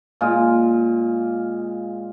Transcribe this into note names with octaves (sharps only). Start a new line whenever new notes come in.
A#2 G#3 F4